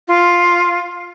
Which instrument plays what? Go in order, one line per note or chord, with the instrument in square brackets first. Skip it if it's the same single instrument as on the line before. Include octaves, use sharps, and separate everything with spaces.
[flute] F4